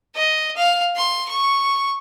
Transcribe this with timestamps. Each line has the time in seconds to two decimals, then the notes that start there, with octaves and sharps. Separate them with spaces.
0.16 D#5
0.57 F5
0.96 C6
1.29 C#6